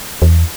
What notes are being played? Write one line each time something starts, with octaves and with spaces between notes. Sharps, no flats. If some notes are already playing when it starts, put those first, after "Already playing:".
E2